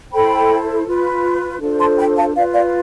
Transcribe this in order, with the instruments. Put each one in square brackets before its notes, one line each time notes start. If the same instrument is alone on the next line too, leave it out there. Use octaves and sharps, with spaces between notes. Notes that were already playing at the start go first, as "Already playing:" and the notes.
[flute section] E4 A4 C5 G5 B5
F4 B4
D4 F4 A4 C5
A5 C6
G5 B5
F5 A5
F4 B4 D5 F5
D5 F5